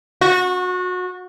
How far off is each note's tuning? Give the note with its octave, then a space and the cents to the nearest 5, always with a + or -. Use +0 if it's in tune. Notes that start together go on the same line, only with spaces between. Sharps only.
F#4 -25